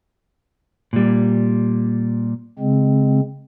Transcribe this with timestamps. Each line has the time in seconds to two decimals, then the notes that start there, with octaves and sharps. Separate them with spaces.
0.93 A#2 G3
2.59 C#3 G#3 C4